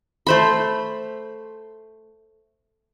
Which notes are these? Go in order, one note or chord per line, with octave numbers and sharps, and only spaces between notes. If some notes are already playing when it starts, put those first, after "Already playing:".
A3 C5 B5